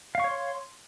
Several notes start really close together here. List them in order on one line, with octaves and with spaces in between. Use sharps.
F5 C#6 C#5 C6